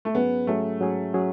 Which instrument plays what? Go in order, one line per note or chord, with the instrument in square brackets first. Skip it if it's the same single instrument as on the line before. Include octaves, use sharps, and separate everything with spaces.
[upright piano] A3
[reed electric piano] G#2 F#3 C#4 G#4 [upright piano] B3
[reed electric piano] G#2 F#3 C#4 G#4 [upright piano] A3
[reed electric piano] G#2 F#3 C#4 G#4
F#3 C#4 G#4